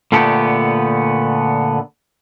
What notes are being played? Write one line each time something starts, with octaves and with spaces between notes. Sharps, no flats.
A#2 D3 A3 B3 G4